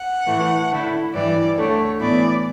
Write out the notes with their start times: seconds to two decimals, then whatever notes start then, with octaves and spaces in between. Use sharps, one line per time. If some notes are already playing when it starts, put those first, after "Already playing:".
Already playing: F#5
0.26 A2 E3 A3
0.71 D3 A3 E4
1.14 G2 E3 G3 D5
1.57 D2 D3 A3 C#5
2.00 A2 E3 B3 E4 D5